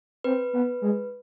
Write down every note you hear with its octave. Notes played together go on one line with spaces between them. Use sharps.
C4 B4
B3
G#3